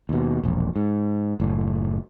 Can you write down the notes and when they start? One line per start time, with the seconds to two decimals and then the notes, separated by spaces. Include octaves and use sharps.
0.09 D#2 B2
0.43 E1 A#1
0.76 G#2
1.40 F#1 A2